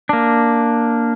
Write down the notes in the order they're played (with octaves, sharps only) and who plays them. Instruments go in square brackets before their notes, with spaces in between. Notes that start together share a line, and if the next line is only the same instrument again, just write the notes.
[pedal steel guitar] A#3 D4